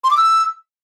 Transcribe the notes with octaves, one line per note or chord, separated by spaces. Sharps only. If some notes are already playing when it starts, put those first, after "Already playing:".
C6
D6
E6